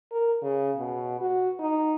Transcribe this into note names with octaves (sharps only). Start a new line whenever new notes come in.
A#4
C#3
B2
F#4
D#4